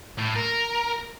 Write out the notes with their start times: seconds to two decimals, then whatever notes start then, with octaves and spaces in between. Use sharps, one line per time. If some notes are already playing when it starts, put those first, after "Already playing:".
0.18 A2
0.36 A#4